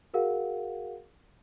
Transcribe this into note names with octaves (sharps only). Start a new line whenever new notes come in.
F#4 G#4 A#4 F5 F#5